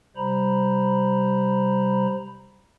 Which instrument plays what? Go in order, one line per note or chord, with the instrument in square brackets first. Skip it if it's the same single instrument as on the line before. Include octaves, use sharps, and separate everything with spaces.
[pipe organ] C3 G3 C5 A#5 B5